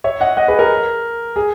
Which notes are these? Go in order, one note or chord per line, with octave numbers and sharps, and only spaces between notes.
C#5 E5
D#5 F#5
D#5 F#5
G#4 B4
A#4
G#4